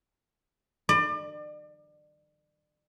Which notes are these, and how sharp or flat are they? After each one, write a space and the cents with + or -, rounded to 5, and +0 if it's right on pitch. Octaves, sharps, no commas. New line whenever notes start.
D5 +35